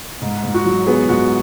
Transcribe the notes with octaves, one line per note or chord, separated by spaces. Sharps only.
G#2
G#2
F#4
F#3
B3 G#4
G#2 F#4